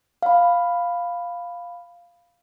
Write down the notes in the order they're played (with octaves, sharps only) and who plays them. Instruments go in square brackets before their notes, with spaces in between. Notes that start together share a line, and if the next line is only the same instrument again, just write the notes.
[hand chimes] F5 B5